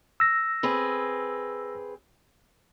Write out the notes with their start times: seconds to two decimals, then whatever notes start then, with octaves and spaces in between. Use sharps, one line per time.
0.20 E6 A#6
0.63 C4 G#4 B4